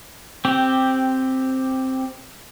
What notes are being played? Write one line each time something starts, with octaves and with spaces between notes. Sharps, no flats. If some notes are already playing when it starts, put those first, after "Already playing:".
C4 G4